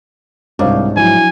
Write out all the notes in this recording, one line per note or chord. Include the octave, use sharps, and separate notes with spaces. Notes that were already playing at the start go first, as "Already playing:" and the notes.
C2 G#2 D4 C#5 F5 D6
F3 F#3 E4 G#5